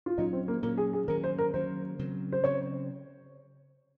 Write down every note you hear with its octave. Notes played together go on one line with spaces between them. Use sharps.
F4
A#2 F#3 C#4 D#4
C4
A#3
A#2 F#3 A#3 C#4
G#4
G#4
D#3 F#3 A#3 C#4 A#4
C5
A#4
D#3 F#3 A#3 C#4 C5
C#3 F#3 C4
C5
C#3 F#3 C4 C#5